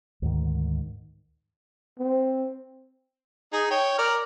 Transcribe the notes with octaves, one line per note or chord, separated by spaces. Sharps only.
D2 G#2 D#3
C4
D#4 G#4
C#5 G5
A#4 D5 F6